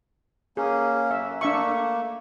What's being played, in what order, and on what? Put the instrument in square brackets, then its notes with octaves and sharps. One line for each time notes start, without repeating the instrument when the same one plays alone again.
[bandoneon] A#3 C#4 [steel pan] G#4
[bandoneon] F#2 [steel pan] E5
[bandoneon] A3 A#3 [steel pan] D4 E5 C#6